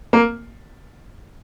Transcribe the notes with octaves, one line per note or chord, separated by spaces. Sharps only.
A#3